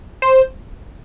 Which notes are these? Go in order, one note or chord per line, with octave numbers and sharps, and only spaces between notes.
C5